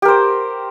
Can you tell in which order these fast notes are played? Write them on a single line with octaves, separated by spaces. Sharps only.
G4 A#4 C5